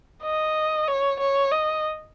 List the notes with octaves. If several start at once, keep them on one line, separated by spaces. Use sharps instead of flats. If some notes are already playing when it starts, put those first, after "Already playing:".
D#5
C#5
C#5
D#5